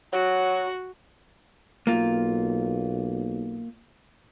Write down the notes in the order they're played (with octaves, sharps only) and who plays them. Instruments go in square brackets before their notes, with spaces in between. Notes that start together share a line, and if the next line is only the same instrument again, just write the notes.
[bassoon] F#3 [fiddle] F#4
[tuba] B1 [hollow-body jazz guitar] A#3 F4